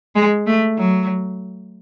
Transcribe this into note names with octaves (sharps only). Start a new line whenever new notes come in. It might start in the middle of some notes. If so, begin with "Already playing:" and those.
G#3
A3
F#3